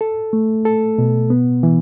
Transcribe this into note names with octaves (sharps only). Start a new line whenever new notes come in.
A4
A3
A4
B2
B3
E3